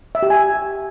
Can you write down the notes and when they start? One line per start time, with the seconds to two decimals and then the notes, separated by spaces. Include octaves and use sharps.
0.15 E5
0.23 G4
0.30 G#5